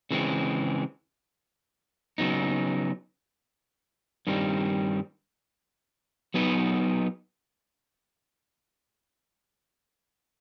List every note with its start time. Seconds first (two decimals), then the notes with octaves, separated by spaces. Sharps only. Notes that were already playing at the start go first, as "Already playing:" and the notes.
0.11 C#3 E3 G#3 C4
2.18 C#3 F#3 B3 D#4
4.27 G2 D#3 G3 C4
6.34 F#3 B3 D#4 G#4 B4